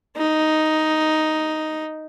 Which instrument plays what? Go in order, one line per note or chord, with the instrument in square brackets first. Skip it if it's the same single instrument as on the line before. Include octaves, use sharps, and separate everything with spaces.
[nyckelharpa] D#4